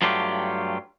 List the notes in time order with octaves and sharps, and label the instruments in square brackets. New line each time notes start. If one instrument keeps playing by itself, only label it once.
[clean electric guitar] G2 F#3 A3 F4 G4